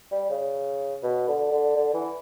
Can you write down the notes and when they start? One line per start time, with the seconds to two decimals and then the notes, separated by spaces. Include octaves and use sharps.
0.11 G3
0.30 C#3
1.03 B2
1.28 D3
1.51 D3
1.76 D3
1.94 E3